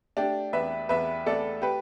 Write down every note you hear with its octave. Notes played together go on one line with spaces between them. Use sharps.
A3 D4 G4
E2 B4 E5
E2 B4 E5
A3 A4 D5
G4 B4